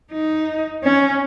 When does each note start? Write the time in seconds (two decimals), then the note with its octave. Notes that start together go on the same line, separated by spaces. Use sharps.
0.12 D#4
0.83 C#4